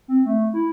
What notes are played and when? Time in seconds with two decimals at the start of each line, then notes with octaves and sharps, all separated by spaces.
0.08 C4
0.26 A3
0.53 E4